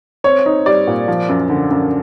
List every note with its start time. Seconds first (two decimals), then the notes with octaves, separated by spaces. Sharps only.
0.24 C4 C#5
0.46 D#4
0.66 G3 D5
0.87 A#2
1.08 F3
1.29 F#2
1.49 D3
1.71 F#2